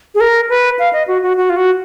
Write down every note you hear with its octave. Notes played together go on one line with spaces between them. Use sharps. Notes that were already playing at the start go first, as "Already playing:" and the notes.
G#4
A#4
B4
F5
D#5
F#4
F#4
F#4
F4
F#4